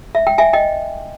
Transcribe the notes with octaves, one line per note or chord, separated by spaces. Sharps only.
E5
G5
E5 G#5
D#5 G5